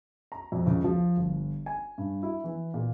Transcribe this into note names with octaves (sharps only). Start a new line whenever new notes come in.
A#5
F2
C#2
F3
G1
G#5
G2
E4
E3
A#2